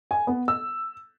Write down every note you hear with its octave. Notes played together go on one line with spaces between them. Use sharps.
G#5
B3
E6